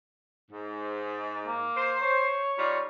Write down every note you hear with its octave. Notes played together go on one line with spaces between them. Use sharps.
G#2
A#3
C5
C#5
G3 D#4 F4